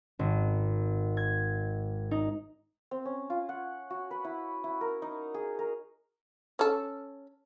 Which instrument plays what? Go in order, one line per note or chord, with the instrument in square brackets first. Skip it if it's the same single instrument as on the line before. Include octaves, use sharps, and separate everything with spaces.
[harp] G#1
G#6
D#4
[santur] C4
C#4
F4
F#5
F#4
B4
E4
E4
A#4
D#4
G#4
A#4
[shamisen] C#4 A4